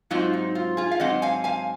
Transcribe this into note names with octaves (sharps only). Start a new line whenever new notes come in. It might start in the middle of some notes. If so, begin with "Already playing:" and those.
G#2 F#3 C4 D#4 F4
D#4
F4
F4 G#4
F5
G#2 F#3 C4 D#5 F#5
F5 G#5
F5 G#5